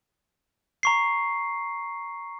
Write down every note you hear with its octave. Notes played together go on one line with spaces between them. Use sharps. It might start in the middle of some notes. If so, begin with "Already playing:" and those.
A#5 C#6 C7